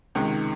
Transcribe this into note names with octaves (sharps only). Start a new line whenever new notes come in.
C#2 C3 D#3 G#3